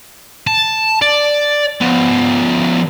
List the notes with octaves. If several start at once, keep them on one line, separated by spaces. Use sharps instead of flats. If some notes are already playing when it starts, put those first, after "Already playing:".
A5
D5
F3 B3